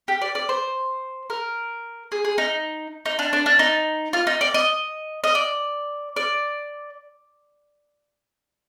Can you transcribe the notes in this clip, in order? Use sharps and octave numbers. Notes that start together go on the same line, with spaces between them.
G4
D5
D5
C5
A#4
G#4
G#4
D#4
D#4
D4
D4
D4
D#4
F4
D#4
D5
D#5
D#5
D5
D5